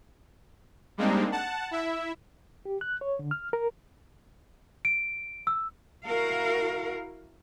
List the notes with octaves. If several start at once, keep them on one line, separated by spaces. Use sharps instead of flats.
G3 G#3 A#3 C4 D4 D#4
F#5 A5
E4 E5
G4
F#6
C#5
D3
F6
A#4
D7
E6
E4 F#4 A#4 F5